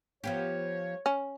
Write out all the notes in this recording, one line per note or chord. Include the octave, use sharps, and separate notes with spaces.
F3 B3 G4 C#5
C#4